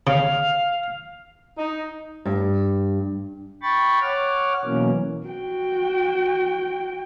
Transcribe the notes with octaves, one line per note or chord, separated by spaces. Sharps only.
C#3 F5
D#4
G2
G5 B5 C#6 A6
C#5 F#5 D6 F6
B2 E3 F#3 A#3 C#4
F#4 G5